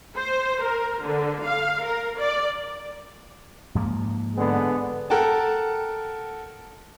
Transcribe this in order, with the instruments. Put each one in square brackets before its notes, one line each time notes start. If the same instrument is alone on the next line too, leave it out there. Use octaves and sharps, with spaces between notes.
[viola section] C5
A#4
D3
F5
A#4
D5
[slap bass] G#2 F3 A#3
[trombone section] D3 G#3 B3
[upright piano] A4 A#4 F#5 G5 A5